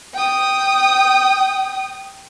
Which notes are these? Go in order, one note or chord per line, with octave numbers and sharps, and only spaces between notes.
G5 D#6